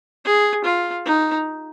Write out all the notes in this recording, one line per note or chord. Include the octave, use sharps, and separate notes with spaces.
G#4
F4
D#4